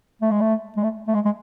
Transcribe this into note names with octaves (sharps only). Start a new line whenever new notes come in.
A3
G#3
A3
G#3
A3
A3
G#3
G#3